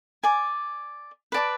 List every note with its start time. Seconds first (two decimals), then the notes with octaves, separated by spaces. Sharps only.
0.24 D5 G#5 D6
1.32 B4 D5 A5 D6